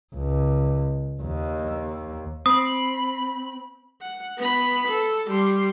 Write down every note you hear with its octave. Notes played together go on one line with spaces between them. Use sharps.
C#2
D#2
C4 B5 D#6
F#5
B3 B5
A4
G3 C6